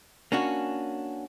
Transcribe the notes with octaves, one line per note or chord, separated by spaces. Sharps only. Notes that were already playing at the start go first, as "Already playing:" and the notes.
A#3 C#4 D4 F#4